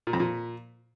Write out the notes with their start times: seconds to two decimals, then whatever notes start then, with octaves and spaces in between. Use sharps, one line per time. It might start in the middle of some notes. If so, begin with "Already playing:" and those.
0.07 A#2
0.13 F2
0.20 A#2